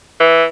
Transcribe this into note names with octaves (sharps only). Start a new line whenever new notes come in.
E3